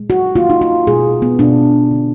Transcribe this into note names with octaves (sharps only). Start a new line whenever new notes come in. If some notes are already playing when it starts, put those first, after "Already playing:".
Already playing: A#2 G#3
F#4
D#3 F#3 A#3 F4
D#4
F4
B2 G#3 G#4
B3
B2 G#3 D4
D3 G#3